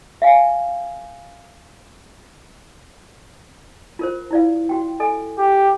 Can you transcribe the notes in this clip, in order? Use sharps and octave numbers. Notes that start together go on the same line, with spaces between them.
E5 F5 G#5
F4 A#4 C5
E4 D5 F5
F#4 G5
A4 D#5 G#5
G4